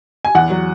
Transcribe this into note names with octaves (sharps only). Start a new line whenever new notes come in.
G#5
E2 F#5
F#3